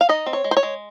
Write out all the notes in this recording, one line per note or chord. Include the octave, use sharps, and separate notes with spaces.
F5
D#4 D#5
C4
C#5
G#3
C5
C#5
G#3